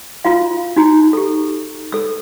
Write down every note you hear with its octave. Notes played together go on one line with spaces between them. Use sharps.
F4 F#4 F5
D#4 F#4 A#5
G4 A4
A4 E6